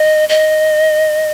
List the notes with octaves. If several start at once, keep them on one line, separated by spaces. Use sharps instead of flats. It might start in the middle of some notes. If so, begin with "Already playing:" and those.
Already playing: D#5
D#5